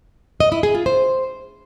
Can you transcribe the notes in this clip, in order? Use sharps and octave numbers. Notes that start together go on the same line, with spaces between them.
D#5
E4
G#4
F4
C5